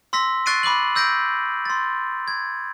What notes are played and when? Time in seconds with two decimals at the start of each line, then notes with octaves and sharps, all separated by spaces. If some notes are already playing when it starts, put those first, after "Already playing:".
0.13 C6 E6 A#6 B6
0.46 C#6 F#6 A6 C7 D7 D#7
0.63 B5 D6 F#6 F#7
0.96 E6 G6 A#6 B6 D7
1.65 C6 A6
2.28 G#6